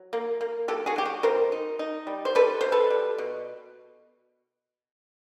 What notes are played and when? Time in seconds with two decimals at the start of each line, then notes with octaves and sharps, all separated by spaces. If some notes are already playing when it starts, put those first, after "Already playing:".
Already playing: F#3
0.13 A#3
0.41 A#3
0.68 F#3 G4 A4
0.86 F#4 G#4
0.96 F#3 G4
1.05 F#4
1.23 B2 A#4 C5
1.52 D#4
1.79 D#4
2.07 G3
2.25 C5
2.35 G3 A4 B4
2.61 B2 C5
2.72 A4 B4
2.90 G3
3.18 B2